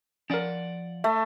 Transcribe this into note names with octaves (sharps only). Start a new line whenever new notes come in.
F3 C#4 A#4 D5 F#5
A3 E5